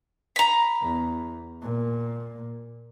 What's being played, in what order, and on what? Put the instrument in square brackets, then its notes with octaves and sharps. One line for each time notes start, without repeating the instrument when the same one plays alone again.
[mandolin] A#5 B5
[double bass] E2
A#2